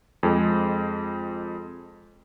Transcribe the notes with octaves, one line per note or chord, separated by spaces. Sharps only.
F2 G#3